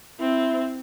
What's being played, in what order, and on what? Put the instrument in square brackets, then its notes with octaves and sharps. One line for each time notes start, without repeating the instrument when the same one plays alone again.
[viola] C4 [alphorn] E4